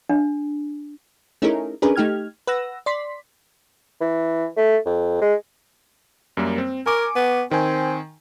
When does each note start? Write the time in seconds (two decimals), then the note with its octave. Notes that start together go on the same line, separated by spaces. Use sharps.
0.09 D4
1.42 A3 C#4 D#4 E4 G#4 A#4
1.82 C#4 D4 G#4 A#4 B4
1.96 A3 D#4 G4 F6 G#6
2.47 B4 F#5 E6 A#6
2.86 D5 C6 B6
4.01 E3
4.57 A3
4.86 F2
5.21 G#3
6.37 F#2 G3 A#3
6.58 C4
6.86 A#4 G#5 C#6 D6
7.16 B3
7.51 D#3 C4 G#5